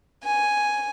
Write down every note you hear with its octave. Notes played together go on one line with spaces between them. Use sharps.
G#5